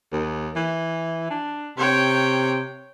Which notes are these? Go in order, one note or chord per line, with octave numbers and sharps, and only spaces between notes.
D#2
E3
D4
C3 C#5 G5